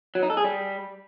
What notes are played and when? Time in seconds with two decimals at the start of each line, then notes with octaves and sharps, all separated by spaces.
0.15 F#3
0.23 D#4
0.30 A4
0.37 G#4
0.44 G3